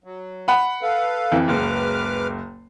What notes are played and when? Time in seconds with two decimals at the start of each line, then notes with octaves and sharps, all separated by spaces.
0.04 F#3
0.48 F#5 B5
0.82 A4 B4 F5
1.32 F2 E3
1.48 F#1 C#2 B4 D6 F6